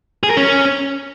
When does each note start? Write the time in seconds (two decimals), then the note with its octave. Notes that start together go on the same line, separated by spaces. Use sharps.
0.23 G#4
0.30 A#4
0.37 C#4